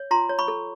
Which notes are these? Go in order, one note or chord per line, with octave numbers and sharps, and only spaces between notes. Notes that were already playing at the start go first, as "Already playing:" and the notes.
Already playing: C#5
F4 A#5 C6
C#5
B5 C#6
A4